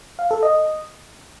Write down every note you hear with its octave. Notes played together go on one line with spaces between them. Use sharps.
F5
A4
D#5